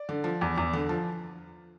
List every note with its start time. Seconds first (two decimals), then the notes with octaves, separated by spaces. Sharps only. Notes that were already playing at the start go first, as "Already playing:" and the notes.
Already playing: D5
0.09 D3
0.24 F3
0.41 E2
0.58 E2
0.73 D3
0.89 F3